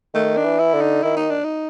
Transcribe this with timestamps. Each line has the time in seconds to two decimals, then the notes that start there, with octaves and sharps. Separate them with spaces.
0.14 D#3 A3
0.37 D4
0.44 E3
0.59 E4
0.74 D3
0.81 D#4
1.03 D#3 E4
1.17 D#4
1.30 D4
1.44 D#4